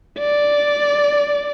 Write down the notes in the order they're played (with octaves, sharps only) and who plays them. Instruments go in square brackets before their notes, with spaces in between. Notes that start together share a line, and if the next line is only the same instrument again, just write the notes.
[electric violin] D5